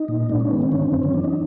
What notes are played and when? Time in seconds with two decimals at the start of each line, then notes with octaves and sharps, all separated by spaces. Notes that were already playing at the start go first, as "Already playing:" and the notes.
Already playing: D#4
0.08 A#2
0.29 G#2 D4
0.40 C#4
0.51 D#3 B3
0.62 C4
0.72 D3 C#4
0.82 C4
0.93 F#2 C4
1.03 C#4
1.14 E3 D4
1.24 D#4